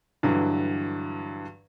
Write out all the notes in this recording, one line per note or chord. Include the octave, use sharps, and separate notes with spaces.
G2 D3 E3 F#3